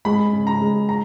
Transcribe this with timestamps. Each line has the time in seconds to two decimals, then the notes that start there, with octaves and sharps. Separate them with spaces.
0.05 G#3 B5
0.33 C#3
0.47 A#5
0.61 G#3
0.89 A#5